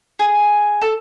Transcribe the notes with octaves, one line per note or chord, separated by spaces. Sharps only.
G#4
A4